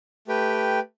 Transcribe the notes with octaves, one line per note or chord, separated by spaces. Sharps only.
A3 G4 B4 G5